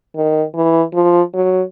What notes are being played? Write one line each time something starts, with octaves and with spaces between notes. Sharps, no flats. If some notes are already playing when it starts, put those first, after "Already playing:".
D#3
E3
F3
F#3